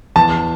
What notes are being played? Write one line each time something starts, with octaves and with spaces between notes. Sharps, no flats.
E2 A5